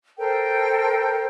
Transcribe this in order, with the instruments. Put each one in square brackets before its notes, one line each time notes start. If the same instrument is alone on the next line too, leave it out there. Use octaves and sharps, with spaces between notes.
[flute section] A4 A#4 C5 G5